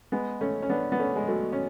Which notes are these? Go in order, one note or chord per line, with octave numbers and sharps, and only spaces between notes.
G#3 B3
A3 C#4
C#4
B3 D4
B3
A3 C#4
G#3
F#3 A3
C#4